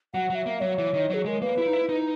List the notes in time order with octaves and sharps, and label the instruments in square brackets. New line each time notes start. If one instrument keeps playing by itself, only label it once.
[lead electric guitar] F#3 [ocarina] F#5
[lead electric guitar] F#3
[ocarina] E5
[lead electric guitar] A#3
[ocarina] E5
[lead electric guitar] F#3 [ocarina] C#5
[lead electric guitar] E3
D#3
[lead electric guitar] F#3 [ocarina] G#4
[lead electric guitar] G#3 [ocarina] A#4
[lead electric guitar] A#3 [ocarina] B4
[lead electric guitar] E4
D#4
E4
D#4